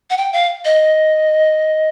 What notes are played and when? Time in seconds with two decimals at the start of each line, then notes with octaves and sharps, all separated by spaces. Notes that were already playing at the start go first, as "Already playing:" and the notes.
0.10 F#5
0.17 G5
0.33 F5
0.65 D#5